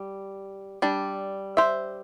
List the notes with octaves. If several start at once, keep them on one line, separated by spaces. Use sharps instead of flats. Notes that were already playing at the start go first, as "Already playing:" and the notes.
Already playing: G3
G3 D4
C5 E5